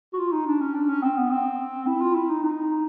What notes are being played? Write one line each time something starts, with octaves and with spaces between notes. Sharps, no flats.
F#4
F4
D#4
D4
C#4
D4
C#4
C4
B3
C4
E4
F4
E4
D#4
D#4